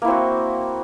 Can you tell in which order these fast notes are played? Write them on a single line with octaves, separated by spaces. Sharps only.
A#3 E4 C4 F#4